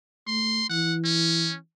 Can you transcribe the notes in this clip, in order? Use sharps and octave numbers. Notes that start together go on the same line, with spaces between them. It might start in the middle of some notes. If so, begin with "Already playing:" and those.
A3 C6
E3 F#5
C#4